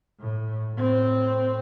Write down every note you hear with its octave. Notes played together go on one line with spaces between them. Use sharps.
A2
A2 C4